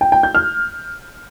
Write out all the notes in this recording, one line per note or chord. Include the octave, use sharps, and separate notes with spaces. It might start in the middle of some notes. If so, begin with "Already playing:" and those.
G5
G5
G6
F6